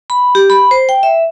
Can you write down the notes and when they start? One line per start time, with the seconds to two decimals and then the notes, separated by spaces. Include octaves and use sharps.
0.10 B5
0.35 G4
0.50 B5
0.71 C5
0.89 G5
1.03 E5